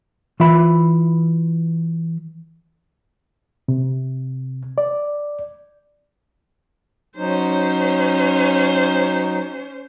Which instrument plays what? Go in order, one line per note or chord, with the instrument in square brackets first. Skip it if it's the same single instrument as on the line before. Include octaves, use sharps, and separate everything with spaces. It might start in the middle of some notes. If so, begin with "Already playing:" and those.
[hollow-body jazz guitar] E3 F4 E5 B5
[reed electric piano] C3
D5
[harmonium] F#3 D#4 [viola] C#4 C5